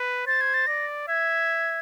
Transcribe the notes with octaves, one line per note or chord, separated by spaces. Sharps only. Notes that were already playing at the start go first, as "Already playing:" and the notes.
Already playing: B4
C5 A6
G#6
A6
D5 A#6
E5 G#6